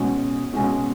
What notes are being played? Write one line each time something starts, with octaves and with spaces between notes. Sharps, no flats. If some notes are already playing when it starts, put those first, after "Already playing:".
Already playing: B2 G#3 C#4 F#4
B2 G#3 C#4 F#4